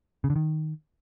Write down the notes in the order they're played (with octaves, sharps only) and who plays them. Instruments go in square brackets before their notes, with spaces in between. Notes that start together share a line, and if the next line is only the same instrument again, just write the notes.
[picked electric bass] C#3
D3
D#3